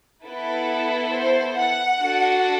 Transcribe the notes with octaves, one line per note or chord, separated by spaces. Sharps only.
B3 E4 A4 B4
C5
F#5
D4 F#4 A4